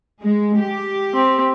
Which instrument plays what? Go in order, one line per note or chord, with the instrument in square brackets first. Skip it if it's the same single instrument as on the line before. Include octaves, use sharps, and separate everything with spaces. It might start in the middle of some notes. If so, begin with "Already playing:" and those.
[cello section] G#3
G4
[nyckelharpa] C4